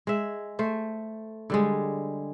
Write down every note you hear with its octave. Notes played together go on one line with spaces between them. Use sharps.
G#3 E5
A3 C5
D3 G3 G#3